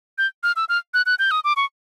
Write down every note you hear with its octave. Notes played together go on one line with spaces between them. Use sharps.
G6
F6
E6
F6
F#6
F#6
G6
D#6
D6
C#6